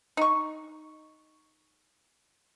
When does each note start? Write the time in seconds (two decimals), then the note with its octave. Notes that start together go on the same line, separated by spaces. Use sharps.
0.17 D#4 C#6